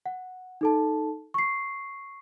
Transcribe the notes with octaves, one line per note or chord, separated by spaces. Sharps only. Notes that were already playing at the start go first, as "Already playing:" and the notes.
F#5
D#4 A4 A5
C#6 C7